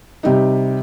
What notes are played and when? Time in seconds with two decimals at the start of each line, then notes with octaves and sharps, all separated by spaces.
0.23 C3 G3 D#4